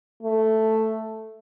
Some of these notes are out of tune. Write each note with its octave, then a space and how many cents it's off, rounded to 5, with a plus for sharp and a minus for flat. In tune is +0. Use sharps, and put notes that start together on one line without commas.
A3 +0